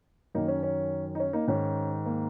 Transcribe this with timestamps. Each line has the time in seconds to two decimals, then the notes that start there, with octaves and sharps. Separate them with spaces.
0.35 F#2 D#3 A#3 D#4
0.48 C#4
0.63 C#4
1.15 D#4
1.20 C#4
1.33 A#3 D#4
1.48 G#2 D#3 C#4
2.06 A#3